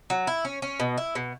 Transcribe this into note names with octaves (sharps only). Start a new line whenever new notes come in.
F#3
E4
C#4
C#4
B2
E4
B2